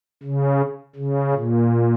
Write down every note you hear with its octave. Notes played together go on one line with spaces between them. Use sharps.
C#3
C#3
A#2